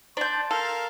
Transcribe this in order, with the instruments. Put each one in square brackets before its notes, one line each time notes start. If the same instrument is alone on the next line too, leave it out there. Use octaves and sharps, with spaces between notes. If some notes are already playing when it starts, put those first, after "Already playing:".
[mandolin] D4 G6 [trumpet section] A5 C6
[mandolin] A4 [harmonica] A#4 F5